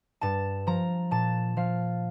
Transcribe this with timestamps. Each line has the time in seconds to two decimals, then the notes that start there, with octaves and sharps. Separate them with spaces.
0.21 G2 A5
0.67 F3 A#5
1.11 A#2 A5
1.57 F3 F5